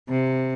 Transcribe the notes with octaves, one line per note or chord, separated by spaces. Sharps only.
C3